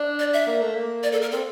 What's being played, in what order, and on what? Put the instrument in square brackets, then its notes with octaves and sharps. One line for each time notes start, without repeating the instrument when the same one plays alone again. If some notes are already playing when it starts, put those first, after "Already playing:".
Already playing: [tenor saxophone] D4
[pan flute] D5
E5
[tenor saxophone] A#3
A3
A#3
[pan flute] D5
A4
A#4
[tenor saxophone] C4 [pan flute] A4